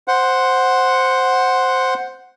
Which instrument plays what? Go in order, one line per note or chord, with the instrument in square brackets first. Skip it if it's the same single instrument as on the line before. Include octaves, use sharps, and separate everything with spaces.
[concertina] C5 F#5